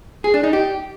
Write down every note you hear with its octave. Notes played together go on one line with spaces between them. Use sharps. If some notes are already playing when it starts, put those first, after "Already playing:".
G#4
D4
D#4
G4